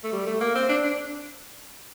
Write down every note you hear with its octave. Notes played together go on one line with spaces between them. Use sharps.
A3
G3
A3
A#3
C4
D4
D4